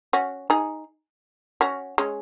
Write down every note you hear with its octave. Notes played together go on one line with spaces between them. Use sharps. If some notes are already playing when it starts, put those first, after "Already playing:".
C#4 F#4
D#4 G#4
C#4 F#4
G#3 C#4